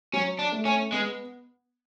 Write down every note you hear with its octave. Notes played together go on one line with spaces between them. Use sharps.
F#3 C#4
D4
A3
C#4
G#3 B3